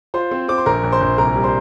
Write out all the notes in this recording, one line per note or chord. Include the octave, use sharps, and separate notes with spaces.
F4 C5 C6
C4
C4 D6
C6
A#1 A#4 A#5
A#1
C5 C6
A#1
C2 A#4 A#5
G3
C5 C6